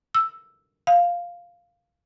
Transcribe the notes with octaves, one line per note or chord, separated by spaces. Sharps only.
E6
F5